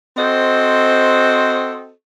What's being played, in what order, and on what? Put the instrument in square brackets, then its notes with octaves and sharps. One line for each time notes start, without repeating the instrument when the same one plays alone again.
[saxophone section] C4 F#4 A4 C5 D#5